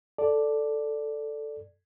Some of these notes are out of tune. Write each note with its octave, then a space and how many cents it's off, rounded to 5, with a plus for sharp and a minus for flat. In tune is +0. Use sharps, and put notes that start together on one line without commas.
A4 +0 D5 +0